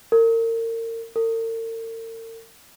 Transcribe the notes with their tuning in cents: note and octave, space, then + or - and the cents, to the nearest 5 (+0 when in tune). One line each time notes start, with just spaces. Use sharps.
A#4 -35
A#4 -45